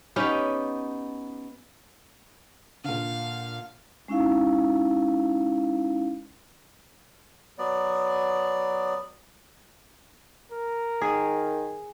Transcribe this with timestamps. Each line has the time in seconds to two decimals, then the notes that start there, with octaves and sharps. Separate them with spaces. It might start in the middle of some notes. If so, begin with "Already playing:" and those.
0.16 B3 C#4 D#4 G4
2.84 A#2 D3 F5
4.08 G#3 C#4 D#4 E4 F5
7.58 F#3 B3 D5
10.52 A#4
11.02 D#3 G#4